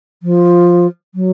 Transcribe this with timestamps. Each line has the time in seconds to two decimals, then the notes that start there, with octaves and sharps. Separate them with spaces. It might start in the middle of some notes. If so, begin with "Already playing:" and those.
0.22 F3
1.14 F#3